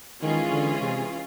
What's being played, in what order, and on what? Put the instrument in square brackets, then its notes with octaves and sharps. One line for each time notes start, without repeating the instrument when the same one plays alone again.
[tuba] D#3 [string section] E3 G#3 C#4 F4 G#4
[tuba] D3
C3